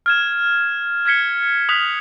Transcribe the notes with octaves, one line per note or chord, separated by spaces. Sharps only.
F6 G#6 E7
F6 G#6 B6 C#7 G7
D#6 F6 F#6 B6 F7